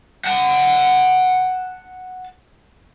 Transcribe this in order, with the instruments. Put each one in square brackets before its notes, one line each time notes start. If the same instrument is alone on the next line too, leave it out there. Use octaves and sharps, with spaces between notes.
[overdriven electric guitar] F#5 A5